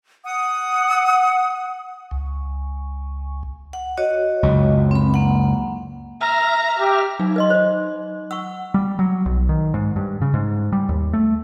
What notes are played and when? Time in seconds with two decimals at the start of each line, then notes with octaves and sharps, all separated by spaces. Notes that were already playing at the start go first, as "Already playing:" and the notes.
0.24 F#5 D#6
2.11 C#2
3.73 F#5
3.97 F#4 C#5 D#5
4.43 C#2 F#2
4.91 C4 B5
5.14 A#3 F#5
6.21 E5 A#5 F6
6.78 G4
7.19 F#3 D#4
7.36 B4 D#5 C6
7.50 C5 D#5
8.31 F#5 C#6 E6
8.74 G3
8.99 F#3
9.26 B1
9.49 D#3
9.74 G#2
9.96 G2
10.22 C#3
10.34 G#2
10.72 G3
10.89 D#2
11.13 A3